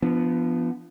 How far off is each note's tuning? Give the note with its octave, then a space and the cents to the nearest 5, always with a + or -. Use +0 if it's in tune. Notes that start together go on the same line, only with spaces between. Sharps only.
F3 -30 B3 +0 D4 +0